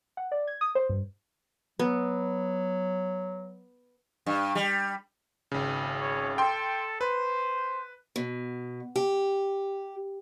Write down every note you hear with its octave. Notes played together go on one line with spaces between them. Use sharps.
F#5
D5
G#6
D#6
C5
G2
F#3 B3
G2
G3
G#1 C#3
C#5
A4 G5 C6
B4 C5
B2
G4